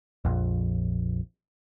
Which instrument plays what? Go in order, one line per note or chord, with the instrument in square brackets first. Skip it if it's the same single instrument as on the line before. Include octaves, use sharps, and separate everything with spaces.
[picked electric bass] A#1 F2